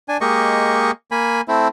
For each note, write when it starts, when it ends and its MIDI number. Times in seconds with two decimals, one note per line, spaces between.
0.09 0.17 62
0.09 0.17 80
0.21 0.91 56
0.21 0.91 58
0.21 0.91 67
0.21 0.91 75
0.21 0.91 85
1.11 1.41 58
1.11 1.41 80
1.11 1.41 83
1.48 1.68 57
1.48 1.68 60
1.48 1.68 64